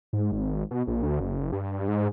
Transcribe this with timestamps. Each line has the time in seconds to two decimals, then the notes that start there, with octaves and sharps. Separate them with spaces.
0.13 G#2
0.32 G#1
0.71 B2
0.87 A#1
1.03 D2
1.20 F#1
1.53 G2
1.88 G#2